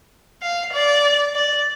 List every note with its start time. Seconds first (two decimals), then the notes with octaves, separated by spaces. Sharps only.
0.42 F5
0.73 D5
1.34 D5